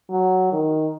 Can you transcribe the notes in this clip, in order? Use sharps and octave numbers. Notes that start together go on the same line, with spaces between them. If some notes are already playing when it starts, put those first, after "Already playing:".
F#3
D#3